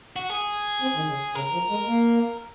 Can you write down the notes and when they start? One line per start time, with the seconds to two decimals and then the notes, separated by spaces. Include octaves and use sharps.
0.16 F#4
0.30 G#4
0.82 C4
0.96 D#3
1.09 C#3
1.35 C#3 A#4
1.53 F3
1.70 G#3
1.88 A#3